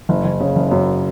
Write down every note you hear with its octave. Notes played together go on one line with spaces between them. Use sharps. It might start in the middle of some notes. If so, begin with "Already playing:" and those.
F#1
F#1
C#3
F#1
F#2